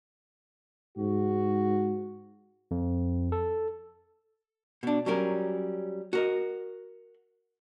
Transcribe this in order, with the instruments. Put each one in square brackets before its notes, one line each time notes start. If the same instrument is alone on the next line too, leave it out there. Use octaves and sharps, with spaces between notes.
[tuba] G#2 [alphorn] F#4
[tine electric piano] F2
A4
[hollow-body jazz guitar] B2 D4
F#3 G3 C#4 A#4
F#4 A#4 D#5